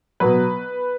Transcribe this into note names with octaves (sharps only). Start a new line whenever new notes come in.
B2 F#3 B4